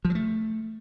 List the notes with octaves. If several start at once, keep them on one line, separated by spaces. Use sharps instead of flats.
F3
F#3
A3